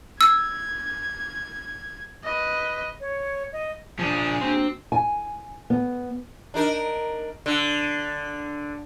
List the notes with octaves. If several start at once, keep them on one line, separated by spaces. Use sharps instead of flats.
E6 G#6
B4 D#5
C#5
D#5
F3 C#4 D4 G#4
A#3 C4 D4 F#4
G#5
B3
D4 D#4 A#4
D3